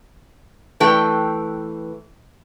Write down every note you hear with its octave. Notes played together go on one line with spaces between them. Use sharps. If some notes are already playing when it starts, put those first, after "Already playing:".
E3 A3 B4 G5